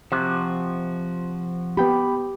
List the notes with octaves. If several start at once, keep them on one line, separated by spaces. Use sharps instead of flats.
C3 F3 F#4 F#6
B3 G4 G5 B5